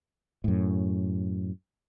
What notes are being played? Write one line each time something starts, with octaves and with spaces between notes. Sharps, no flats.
F#2 A2